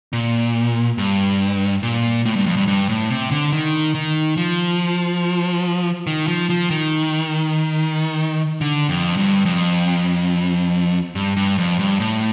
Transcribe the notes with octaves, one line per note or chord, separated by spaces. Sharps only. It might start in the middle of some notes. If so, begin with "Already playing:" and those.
A#2
G2
A#2
A2
G2
F2
G2
G2
A2
C3
D3
D#3
D#3
F3
D#3
F3
F3
D#3
D3
F2
G2
F2
G2
G2
F2
G2
A2